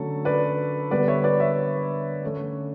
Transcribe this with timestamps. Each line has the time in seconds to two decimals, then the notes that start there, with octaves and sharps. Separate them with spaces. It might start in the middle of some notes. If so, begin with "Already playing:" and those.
Already playing: D3 F#3 A3 C#4 A4
0.25 B4 D5
0.90 D3 G3 B3 B4 D5
1.08 C#5 E5
1.24 B4 D5
1.40 C#5 E5
2.23 D3 A3 C#4